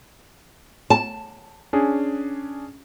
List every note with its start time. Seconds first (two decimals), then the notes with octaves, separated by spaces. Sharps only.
0.90 A5
1.73 C#4 D4 G#4